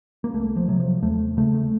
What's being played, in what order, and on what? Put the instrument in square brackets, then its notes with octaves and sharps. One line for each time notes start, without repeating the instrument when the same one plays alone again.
[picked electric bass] A#3
C2 A3
F3
C3 F#3
F3
D#2 A3
C#3 A3
A3